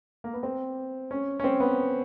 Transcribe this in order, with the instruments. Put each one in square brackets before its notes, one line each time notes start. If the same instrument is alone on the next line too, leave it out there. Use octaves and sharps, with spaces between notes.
[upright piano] A#3
B3
C4
C#4
C#4
C4
B3